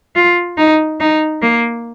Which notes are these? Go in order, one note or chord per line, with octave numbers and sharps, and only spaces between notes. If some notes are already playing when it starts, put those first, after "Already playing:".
F4
D#4
D#4
A#3